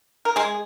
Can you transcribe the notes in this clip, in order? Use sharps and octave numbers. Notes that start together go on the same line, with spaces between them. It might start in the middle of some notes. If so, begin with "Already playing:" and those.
A#4
G#3 G#4